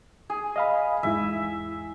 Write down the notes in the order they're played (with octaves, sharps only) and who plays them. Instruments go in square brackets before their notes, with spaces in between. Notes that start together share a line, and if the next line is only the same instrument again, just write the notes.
[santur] G#4
[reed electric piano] D#5 F5 B5
[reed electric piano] E2 G#2 E4 [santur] E5